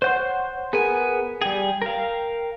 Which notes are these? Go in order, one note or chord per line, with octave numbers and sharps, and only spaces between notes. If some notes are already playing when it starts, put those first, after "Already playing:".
C5 C#5 F#5 C6 G6
B3 G#4 A#4 G#5
G3 G#4 G5
A#4 F5